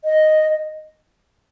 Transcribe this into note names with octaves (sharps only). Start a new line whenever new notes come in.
D#5